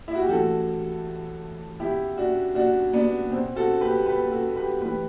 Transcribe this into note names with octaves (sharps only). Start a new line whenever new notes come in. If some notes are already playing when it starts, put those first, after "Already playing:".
E4
F#4
G4
A2 E3 F#4 A4
B2 E4 G4
D4 F#4
D4 F#4
B3 D4
B2 C4
F#4 A4
G4 B4
G4 B4
F#4 A4
G4 B4
A2 E3 G4 B4